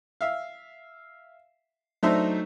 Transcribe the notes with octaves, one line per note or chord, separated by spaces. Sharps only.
E5 F5
F#3 A3 D4 D#4 C5 E5